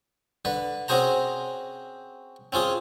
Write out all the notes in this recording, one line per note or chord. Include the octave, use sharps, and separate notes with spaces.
D3 B4
C4 C#4 F#4 G#4 C5 A#5
C4 C#4 F4 G#4